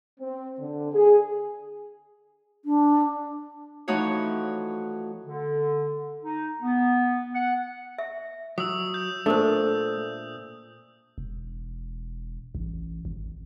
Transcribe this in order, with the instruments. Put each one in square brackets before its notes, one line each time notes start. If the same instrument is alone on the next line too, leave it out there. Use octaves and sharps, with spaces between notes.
[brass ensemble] C4
D3
G#4
[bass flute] D4
[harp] E3 F3 A3 D#4 F#4 C#5
[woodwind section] D3
D#4
B3
F#5
[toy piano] E5
[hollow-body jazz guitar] F#3 [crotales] D#6 E6
[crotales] G6
[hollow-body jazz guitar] A#2 D4 [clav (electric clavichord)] A3 [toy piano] A4 A#4 C5
[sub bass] E1
A1
G#1